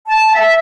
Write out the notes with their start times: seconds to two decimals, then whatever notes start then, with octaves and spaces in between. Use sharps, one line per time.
0.06 A5
0.33 E5